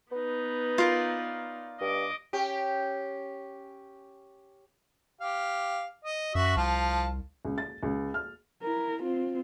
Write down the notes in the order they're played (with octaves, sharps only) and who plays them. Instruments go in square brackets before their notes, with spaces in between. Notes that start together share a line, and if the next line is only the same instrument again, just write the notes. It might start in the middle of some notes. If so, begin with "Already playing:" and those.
[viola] B3 D#4 [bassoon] B4
[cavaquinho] F4 A#4 D5
[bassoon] G2 [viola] D#5 D6
[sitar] C#4 G4
[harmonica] G4 F5
D#5
[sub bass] F#2 [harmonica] F#4 E5
[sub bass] C2 [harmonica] F3 F5 A5
[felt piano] C#2
A6
C#2
F6
[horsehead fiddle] E4 A#4
C4 F4